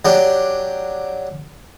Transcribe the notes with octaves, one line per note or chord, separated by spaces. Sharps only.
F#3 D4 G4